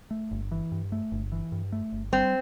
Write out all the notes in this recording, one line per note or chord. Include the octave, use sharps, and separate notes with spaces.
A3
G1
E3
G2
A3
G1
E3
G2
A3
G1
G3 C4